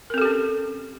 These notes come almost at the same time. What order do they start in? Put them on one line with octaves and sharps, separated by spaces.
A#4 C4 A4 G4 C#4